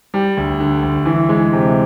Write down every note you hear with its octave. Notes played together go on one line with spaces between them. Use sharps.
G3
D2
D3
D2
E3
G#3
C3